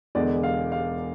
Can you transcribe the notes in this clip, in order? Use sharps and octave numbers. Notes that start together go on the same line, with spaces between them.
E1 E2 D3 G#3 D5
F5
F5